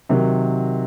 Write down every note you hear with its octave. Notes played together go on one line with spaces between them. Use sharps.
C3 D#3 F#3